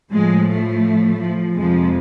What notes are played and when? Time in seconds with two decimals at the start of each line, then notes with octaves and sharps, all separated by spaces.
0.12 A2 F3 G#3
0.48 A3
1.20 F3
1.54 F2 C3 F3 G#3